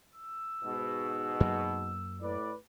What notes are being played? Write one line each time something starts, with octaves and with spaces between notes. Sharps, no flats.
E6
G#2 B2
F#2 F#3 A#3
A2 B4 D5